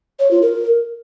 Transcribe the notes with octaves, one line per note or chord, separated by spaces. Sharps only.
C#5
F4
A#4